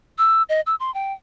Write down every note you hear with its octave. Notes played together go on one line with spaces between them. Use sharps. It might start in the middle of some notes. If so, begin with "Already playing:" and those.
E6
D#5
E6
C6
G5